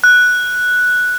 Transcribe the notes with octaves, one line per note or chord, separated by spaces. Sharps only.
F#6